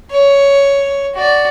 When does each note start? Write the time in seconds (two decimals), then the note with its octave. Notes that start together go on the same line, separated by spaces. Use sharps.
0.12 C#5
1.15 F#4 D5